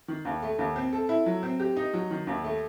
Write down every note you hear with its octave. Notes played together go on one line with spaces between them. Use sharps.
D#3
D#2
A3
D#2
C4
A4
E4
F#3
C4
G4
D#4
F#3
D#3
D#2
A3